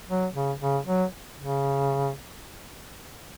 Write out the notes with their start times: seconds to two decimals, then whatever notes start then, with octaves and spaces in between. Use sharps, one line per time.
0.08 F#3
0.34 C#3
0.60 C#3
0.86 F#3
1.38 C#3